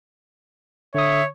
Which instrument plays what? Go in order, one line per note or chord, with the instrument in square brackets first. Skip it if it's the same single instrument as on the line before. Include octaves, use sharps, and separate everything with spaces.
[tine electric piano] D3 D#6 [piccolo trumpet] C#5 [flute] E5